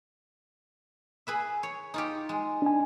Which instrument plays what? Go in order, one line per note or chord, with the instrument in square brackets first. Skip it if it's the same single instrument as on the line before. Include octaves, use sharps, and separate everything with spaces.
[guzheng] G#4 B4 E5
C#5
D#4 F4 G4
G#3
[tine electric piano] D4 G#5